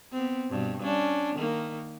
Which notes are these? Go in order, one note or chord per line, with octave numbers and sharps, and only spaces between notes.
B3 C4
G2 B2
C#4 D4
D#3 A#3